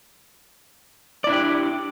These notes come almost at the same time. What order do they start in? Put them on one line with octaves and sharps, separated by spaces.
D5 E4 D4 G4